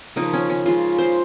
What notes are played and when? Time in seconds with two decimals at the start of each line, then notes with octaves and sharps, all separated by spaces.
0.16 C#3 F3 A#3 D#4
0.33 C#4
0.50 C#4
0.65 C#3 G#3 F4
0.98 C5